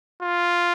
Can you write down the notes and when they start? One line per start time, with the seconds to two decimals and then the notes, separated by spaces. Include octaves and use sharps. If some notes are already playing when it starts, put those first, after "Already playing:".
0.22 F4